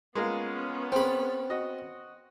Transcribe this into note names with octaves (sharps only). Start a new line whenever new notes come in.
G#3 A#3 B3 C#4 F4
C4 G#4 C5 B5
F#4 D#5